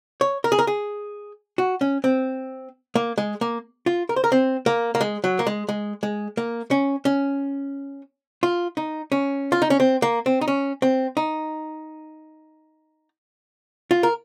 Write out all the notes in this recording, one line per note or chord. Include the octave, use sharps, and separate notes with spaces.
C#5
A#4
G#4
A#4
G#4
F#4
C#4
C4
A#3
G#3
A#3
F4
A#4
C5
A#4
C4
A#3
A#3
G#3
F#3
A#3
G#3
G#3
G#3
A#3
C#4
C#4
F4
D#4
C#4
F4
D#4
C#4
C4
A#3
C4
D#4
C#4
C4
D#4
F4
A#4